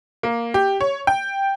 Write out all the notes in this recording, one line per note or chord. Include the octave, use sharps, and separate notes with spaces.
A#3
G4
C#5
G5